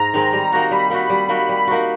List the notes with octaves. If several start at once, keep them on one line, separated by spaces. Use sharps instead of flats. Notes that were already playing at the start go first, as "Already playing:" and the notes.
Already playing: G#2 A#5
D#3 G#3 C4
G3
A#3 D#4 F#4
G3 B5
A#3 D#4 F#4
G3
A#3 D#4 F#4
G3
A#3 D#4 F#4